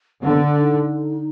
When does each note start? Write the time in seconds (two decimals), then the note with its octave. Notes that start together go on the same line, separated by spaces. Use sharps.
0.23 D3 B3
0.42 D4
0.60 D#4